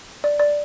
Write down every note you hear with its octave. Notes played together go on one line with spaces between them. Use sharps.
D5
D5